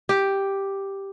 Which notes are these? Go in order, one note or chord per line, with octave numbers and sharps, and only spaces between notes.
G4